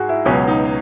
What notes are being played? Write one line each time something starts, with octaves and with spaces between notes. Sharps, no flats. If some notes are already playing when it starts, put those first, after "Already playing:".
Already playing: G#2 F#4 G#4
E4
C#2 B2 F#3 C#4
D#4